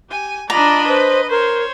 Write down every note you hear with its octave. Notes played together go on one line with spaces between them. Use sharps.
G4 G#5
D4 F4 D5 D#5 A#5 B5
B4 C5
A#4 C5 C#5